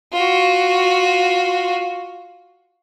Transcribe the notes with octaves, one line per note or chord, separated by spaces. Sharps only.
F4 F#4